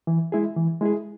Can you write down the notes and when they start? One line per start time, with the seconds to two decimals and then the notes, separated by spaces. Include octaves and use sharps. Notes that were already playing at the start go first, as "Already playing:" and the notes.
0.07 E3
0.32 G#3 E4 G#4
0.56 E3
0.81 G#3 E4 G#4